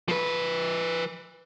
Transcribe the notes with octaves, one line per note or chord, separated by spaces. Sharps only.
F3 B4